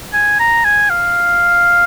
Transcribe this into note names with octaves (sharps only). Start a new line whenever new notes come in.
G#5
A#5
G#5
F5